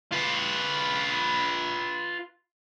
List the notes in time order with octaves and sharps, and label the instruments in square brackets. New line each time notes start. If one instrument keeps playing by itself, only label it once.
[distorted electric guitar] F4 B4